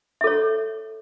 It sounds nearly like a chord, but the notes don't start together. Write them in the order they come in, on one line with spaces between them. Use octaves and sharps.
E5 A4 C#5